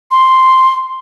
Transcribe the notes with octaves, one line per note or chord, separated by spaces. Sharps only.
C6